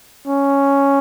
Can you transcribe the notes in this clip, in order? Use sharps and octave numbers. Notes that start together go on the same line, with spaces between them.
C#4